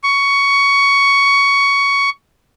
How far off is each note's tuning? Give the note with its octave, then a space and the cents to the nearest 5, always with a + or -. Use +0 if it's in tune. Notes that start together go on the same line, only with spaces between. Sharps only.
C#6 +15